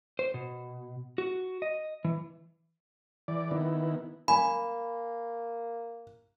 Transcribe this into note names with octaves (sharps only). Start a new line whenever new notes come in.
C5
B2
F#4
D#5
E3
E3 D5
D#3 B3 E4
A#3 G#5 B5